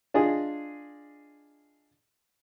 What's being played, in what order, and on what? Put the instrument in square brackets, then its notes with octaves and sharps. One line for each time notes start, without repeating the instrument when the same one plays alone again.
[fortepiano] D4 F4 G#4 D#5